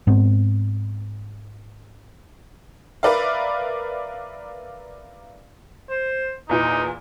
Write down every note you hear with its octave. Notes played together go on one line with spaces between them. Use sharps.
G#2 B3 C4
A#4 B4 D5 E5 F5
C5
E2 A#2 E3 D#4